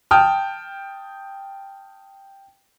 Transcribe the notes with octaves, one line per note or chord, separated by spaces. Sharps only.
G5 A5 D#6 F6